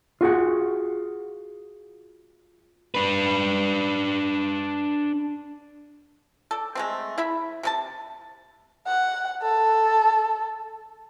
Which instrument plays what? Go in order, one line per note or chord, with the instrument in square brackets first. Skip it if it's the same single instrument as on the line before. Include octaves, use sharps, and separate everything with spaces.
[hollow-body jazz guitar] F4 F#4 G#4 F#5
[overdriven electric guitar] D4 B4
[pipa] A4 D5
G#3 A3 C4
E4 E5 B5
C3 C#4 A5
[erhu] F#5
A4